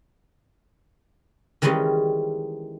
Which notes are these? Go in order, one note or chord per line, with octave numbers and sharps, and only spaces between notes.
D#3 E3 G3 G#3 C#4 D#4